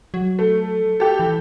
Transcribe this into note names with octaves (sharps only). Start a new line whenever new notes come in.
F#3
A3
G4 A4
E3